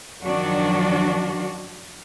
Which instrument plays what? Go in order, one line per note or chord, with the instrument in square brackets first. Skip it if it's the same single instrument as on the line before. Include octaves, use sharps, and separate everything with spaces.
[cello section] F#2 D#3 F3 F#3 D4 F#4